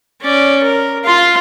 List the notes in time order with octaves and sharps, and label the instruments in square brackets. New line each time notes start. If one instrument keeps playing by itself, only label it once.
[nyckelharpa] C#4 D5
A#4
F4 C6